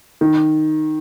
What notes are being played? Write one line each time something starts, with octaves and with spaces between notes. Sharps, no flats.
D#3